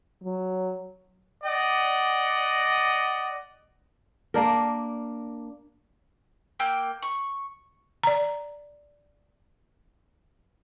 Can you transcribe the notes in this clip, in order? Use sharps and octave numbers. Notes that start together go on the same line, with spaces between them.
F#3
D5 D#5 F#5
A#3 D4 A#4
A#3 G5 E6
C#6
D5 A#5